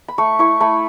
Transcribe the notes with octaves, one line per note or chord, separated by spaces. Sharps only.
B5
A3 C#6
E4 C#6
A3 B5